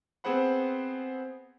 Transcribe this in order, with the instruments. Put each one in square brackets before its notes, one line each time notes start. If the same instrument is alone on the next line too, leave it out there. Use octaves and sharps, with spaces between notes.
[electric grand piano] B3 C4 G#4 C5 F#5 B5